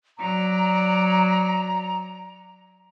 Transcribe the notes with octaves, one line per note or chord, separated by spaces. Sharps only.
F#3 D5 A#5